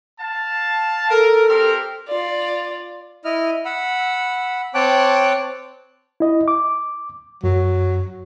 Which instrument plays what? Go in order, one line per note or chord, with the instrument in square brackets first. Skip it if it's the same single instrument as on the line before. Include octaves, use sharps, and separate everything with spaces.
[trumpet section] F5 A5
[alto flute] A4 [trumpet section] A#4
[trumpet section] C4 G4 A#4
[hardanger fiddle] F4 D5
[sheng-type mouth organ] E4 D#5 F6
F#5 B5 E6
C4 C#5 G5 A5 D6 F#6
[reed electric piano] E4 D#5
D6
[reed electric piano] F#2 [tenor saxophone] F#3